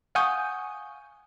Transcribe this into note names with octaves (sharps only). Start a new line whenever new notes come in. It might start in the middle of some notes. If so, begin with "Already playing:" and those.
F5 F#5 G#5 C#6 D#6 G6